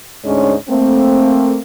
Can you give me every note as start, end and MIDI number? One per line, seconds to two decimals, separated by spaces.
0.24 0.54 38
0.24 0.54 44
0.24 0.54 56
0.24 0.54 61
0.24 0.54 62
0.24 0.54 73
0.69 1.60 57
0.69 1.60 58
0.69 1.60 60